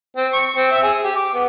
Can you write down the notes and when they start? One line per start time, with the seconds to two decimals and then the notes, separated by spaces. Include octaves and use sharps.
0.16 C4
0.33 C#6
0.56 C4
0.71 E5
0.83 G#4
1.04 G4
1.15 D6
1.34 B3